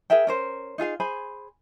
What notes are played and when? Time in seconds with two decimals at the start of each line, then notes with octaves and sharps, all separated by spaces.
0.10 G#4 A#4 E5 G5
0.27 C#4 A#4 C5
0.78 D#4 F4 G#4 F5
1.00 G#4 C5 G#5 B5